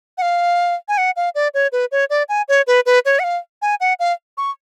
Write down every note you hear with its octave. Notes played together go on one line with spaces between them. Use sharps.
F#5
F5
G#5
F#5
F5
D5
C#5
B4
C#5
D5
G#5
C#5
B4
B4
C#5
F#5
F5
G#5
F#5
F5
C#6